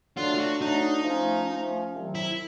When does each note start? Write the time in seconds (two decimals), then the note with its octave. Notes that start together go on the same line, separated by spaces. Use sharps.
0.16 D3 F#3 A3 D4 F4
0.35 F4
0.39 F#4
0.61 D3 F#3 A3 D4 D#4
1.05 F3 A3 C#4
1.49 F3 A3 C#4
1.93 C2 C3 D#3 F#3
2.15 E4